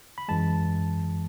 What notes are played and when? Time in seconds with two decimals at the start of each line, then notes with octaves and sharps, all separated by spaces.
0.18 B5
0.28 F#2 E3 G#3 A5